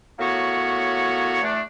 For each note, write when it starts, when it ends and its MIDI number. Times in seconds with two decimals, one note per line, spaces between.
0.19 1.39 45
0.19 1.39 58
0.19 1.39 59
0.19 1.39 66
0.19 1.39 73
1.42 1.59 40
1.42 1.59 57
1.42 1.59 62